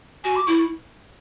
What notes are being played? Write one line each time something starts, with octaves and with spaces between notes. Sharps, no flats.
F#4 G#5
D6
E4 C#6